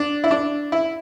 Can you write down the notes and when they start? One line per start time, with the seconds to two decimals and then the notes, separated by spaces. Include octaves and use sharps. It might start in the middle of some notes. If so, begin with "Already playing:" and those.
Already playing: D4
0.24 E4
0.31 D4
0.72 E4